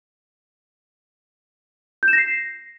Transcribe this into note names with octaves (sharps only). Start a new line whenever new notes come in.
G6
E7
A#6
C7